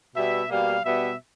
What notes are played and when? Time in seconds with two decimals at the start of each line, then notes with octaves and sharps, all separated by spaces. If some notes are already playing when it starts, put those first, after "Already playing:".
0.15 B2 G3 B3 E5
0.50 B2 G3 A#3 F5
0.84 B2 G3 B3 E5